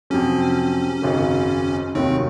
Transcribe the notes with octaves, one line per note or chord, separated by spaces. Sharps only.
F2 C3 F#3 C#4
G#1 F#2 C#3 F#3
F1 D#2 D#3 F#3 C4 C#4